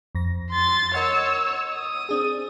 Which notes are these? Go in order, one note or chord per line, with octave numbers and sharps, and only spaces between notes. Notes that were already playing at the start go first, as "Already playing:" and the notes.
F2 A#6
C6 A6
A#4 C#5 D#5 F#5 E6
D#6
C4 D4 G#4